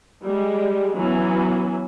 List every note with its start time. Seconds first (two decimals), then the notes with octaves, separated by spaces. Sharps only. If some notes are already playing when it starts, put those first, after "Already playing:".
0.24 G3 G#3
0.95 E3 F#3 B3 C#4